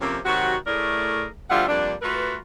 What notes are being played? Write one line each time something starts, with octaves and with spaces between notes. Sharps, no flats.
F2 C3 A#3 C4 C#4
C3 D#3 F#3 F#4
A2 A3 G#4 A#4 D5
D2 F3 G3 F4 E5 F#5
F2 G3 A#3 D4
A3 F4 F#4 A#4 B4